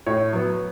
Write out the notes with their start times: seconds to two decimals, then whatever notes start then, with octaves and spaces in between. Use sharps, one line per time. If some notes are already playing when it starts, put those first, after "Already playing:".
0.06 A2 C#5
0.33 F#3 B3